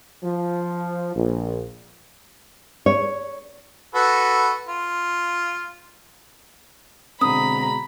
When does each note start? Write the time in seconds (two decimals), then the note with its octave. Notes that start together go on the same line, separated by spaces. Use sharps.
0.23 F3
1.15 A#1
2.86 C#5
3.95 F#4 A4 B4
4.68 F4
7.21 B2 D3 G#3 C4 A#5 B5 D#6